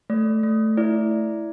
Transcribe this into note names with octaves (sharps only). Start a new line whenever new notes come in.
A3 D5
A3
E4 D5